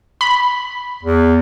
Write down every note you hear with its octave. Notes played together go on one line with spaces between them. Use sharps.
B5
E2